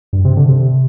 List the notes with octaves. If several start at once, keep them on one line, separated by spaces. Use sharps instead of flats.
G2
C3
D3
C3